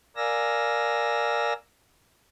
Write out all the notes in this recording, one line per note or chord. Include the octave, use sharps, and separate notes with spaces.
A#4 D5 F5 G#5 E6 A#6